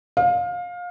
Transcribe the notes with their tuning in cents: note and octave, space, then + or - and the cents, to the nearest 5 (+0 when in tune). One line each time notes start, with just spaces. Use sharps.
F5 +25